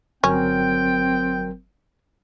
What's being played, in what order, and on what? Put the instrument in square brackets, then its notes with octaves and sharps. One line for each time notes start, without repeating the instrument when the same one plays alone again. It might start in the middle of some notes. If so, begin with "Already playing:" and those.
[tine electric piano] G1 F#3 A#4 [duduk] C4 [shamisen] C#4 [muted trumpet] G5